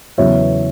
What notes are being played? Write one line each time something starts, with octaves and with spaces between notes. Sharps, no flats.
E2 C#3 F#3 B3 C#5 E5